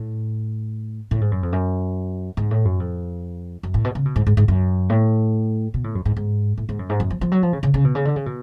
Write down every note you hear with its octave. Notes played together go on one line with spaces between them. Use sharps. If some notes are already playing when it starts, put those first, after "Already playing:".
Already playing: A2
A2
G#2
F#2
F2
F#2
G#2
A2
F#2
F2
F#2
A2
B2
C#3
B2
G#2
G#2
G#2
F#2
A2
B2
A2
F#2
G#2
G#2
A2
G#2
F#2
G#2
F#2
F3
F3
F#3
F3
C#3
C#3
C#3
B2
C#3
D3
C#3
B2